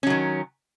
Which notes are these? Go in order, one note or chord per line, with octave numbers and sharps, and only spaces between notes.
D#3 F#3 C#4